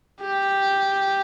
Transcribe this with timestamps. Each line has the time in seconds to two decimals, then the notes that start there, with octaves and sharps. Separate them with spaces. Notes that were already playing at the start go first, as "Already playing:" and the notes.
0.22 G4